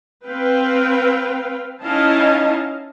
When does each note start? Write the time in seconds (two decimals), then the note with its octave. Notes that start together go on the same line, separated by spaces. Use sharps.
0.25 C4 B4 F5 G5
1.83 C#4 D#4 E4 D#5 F5 A5